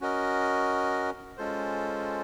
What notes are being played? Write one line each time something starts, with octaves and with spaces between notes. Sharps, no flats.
C#4 F#4 A#4 D#5
G#3 C#4 F4 A4 C5